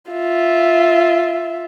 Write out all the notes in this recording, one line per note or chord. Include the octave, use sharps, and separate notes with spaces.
F4 E5